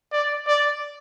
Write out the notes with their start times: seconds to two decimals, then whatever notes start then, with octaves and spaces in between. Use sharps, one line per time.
0.12 D5
0.47 D5